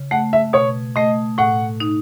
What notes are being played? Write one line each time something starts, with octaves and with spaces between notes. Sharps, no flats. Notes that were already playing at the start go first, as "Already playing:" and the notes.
Already playing: C#3
A3 F#5
E5
B2 C#5
A3 D#5
A2 F#5
D#4